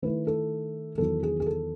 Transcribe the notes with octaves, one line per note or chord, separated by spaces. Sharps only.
D#3 A3 E4 B4
A4
E2 D#3 F#3 A4
G#4
G#4
A4